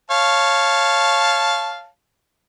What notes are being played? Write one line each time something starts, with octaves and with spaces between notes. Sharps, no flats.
C#5 F5 A5